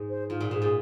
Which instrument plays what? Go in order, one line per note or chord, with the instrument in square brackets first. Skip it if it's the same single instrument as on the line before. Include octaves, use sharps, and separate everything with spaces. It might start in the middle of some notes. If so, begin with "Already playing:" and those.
Already playing: [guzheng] G#2
[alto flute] C5
[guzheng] G#2 [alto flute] F4
[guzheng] A#2
[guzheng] G#2 [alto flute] G#4
[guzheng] A#2 [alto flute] G#4